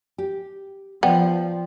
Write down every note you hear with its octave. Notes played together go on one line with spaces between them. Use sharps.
G4
F3 B3 D5 G5